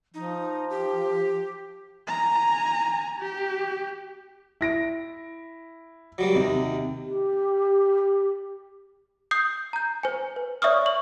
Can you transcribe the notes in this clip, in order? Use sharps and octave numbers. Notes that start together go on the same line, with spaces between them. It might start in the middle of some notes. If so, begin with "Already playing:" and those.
F3 D#4
G4
G#5 A#5
G4
E4 A#6 D7
F#3 G3 A#3
D#2 C3 D#3
G4
D#6 G6 C7
A#5 G6
C5 G#5
B4
C#5 D5 E5 C#6 D#6 F6
C#6 F#7